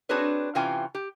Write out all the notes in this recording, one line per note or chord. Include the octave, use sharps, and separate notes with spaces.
C4 D4 F#4 G#4 B4 C#5
C3 E3 C#4 F4 G5 G#5
G4